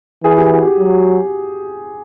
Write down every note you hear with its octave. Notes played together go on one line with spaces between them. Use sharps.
E3 G#4
G4
F#4
G4
F#3